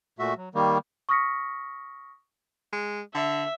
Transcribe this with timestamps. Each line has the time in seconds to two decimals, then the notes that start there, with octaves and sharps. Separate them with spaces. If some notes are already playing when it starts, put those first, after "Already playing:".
0.19 A#2 A3 F#4 E5
0.37 F#3
0.55 D#3 G3 A#3
1.09 C#6 D#6 F6 A#6 B6 C#7
2.73 G#3
3.15 D3 E5